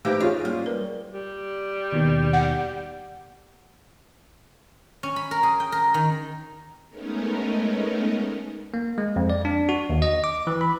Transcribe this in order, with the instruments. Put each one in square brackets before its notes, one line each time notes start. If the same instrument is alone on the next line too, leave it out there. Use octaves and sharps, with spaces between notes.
[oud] E3 A#3 G4 [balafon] A3 D#4 C5
[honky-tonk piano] C#4 F4 G#4 [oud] F5
[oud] G3 [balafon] A#3
[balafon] A#4 B4
[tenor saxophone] G3
[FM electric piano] D#2 B2 D#3
[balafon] F#5
[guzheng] C#4
B5
A#4
G#4
G5
A#4
D#3
[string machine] G#3 A3 B3 C#4 D#4 A#4
[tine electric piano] A#3
G#3
F2
D5
D4
F#4
D#2
D#5
D6
E3
B5